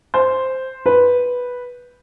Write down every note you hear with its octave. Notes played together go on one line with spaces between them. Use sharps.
C5
B4